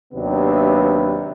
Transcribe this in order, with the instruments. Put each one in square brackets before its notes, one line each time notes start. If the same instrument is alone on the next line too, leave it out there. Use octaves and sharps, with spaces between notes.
[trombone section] D#2 C3 F#3 B3 D4